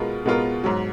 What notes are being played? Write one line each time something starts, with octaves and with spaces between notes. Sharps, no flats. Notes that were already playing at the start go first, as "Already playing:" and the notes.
Already playing: B2 G#3 B3 F4 A#4
B2 G#3 B3 F4 A#4
G#2 F#3